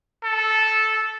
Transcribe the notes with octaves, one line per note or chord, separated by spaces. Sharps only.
A4